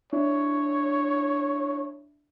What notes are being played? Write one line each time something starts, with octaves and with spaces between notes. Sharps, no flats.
D4 E4 C#5